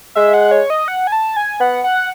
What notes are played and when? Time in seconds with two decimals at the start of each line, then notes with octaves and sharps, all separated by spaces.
0.15 G#3 E5
0.34 F#5
0.51 C#5
0.70 D#5
0.88 F#5
1.07 G#5
1.12 A5
1.36 G#5
1.60 B3 F#5
1.84 F#5